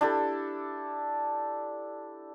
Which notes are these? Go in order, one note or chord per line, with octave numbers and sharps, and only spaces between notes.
D4 E4 G4 A4